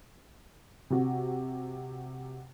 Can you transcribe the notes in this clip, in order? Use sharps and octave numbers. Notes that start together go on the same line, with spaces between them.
C3 F#4